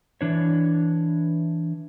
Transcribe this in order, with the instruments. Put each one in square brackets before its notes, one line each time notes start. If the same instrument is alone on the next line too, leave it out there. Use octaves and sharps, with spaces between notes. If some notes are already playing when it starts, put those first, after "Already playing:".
[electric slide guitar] E3 D4 C#5